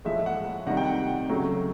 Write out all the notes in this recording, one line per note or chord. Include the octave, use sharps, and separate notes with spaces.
A2 F3 G#3 E5
F#5
C3 D#3 G3 F#5
G5
F#5
C#3 F#3 A3